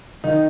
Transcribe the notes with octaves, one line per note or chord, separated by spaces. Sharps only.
D#3 D#4